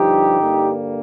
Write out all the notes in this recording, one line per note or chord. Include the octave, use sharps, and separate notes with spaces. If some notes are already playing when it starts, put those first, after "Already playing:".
Already playing: G2 D3 F3 D#4 G4
G2 D3 G3 A#3